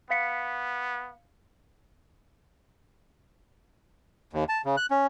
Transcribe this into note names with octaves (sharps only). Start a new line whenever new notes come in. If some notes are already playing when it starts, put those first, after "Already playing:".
B3 F5 B6 C#7
D#2
A5
C#3
F#6
C#4